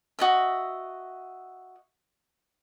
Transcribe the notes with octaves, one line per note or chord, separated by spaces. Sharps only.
F#4 D#5 E5